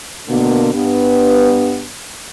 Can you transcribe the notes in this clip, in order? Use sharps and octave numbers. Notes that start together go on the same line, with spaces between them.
B2 D3 A#3
G2 B3